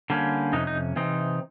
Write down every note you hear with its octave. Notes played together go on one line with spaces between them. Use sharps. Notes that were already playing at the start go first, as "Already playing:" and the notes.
D3 G3 A#3 C#4
F2 C3 C#4 D#4
D#4
C3 E3 C4 D#4